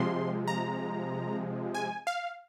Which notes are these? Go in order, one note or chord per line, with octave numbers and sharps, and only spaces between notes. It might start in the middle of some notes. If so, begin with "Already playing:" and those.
Already playing: C3 F3 G#3 C6
A#5
G#5
F5